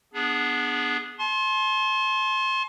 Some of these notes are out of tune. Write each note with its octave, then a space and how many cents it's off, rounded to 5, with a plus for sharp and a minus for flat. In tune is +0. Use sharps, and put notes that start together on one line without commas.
B3 -10 D4 +0 G#4 +0
A5 -40 C6 +25